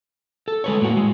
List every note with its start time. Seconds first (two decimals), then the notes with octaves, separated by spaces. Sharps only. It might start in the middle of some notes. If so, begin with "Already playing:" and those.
0.48 A4
0.64 G#3 B4 C#5
0.81 A2 A#3 F#4
0.97 G#3